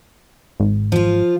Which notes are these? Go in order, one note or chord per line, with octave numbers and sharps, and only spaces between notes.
G#1
F3 F4